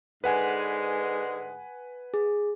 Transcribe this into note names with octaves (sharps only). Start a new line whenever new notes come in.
G#2 D3 G#3 B4 F#5 G#5
G#4